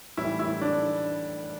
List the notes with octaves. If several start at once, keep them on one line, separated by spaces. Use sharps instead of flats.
A2 E3 G3 E4
E4
D4